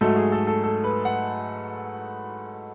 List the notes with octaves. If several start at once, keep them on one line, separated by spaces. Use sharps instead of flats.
G#2 F#3 A3 A4
G#4
A4
A4
A4
B4
F#5